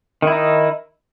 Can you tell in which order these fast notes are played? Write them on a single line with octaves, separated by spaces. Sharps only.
D#3 E4 D#4